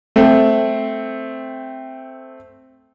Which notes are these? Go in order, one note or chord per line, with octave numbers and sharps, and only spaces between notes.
A3 C4